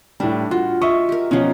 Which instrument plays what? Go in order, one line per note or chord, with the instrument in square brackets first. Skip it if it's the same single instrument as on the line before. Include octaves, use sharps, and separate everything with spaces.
[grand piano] A2 G3 [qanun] D4
[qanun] F4 [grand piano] F#4
[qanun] D#5 [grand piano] E5 C#6
[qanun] G4 A#4
[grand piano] B2 C#4 F4 [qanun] F3 D#4